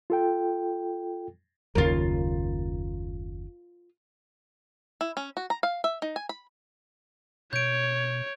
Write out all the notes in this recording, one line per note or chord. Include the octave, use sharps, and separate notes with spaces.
F4 A4 G5
F#1 D#2 C#3 F4 A#4
E4
C#4
F#4
A#5
F5
E5
D#4
G#5
B5
B2 C#5 G6 D7